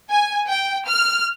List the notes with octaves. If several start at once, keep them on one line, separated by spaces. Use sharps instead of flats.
G#5
G5
F6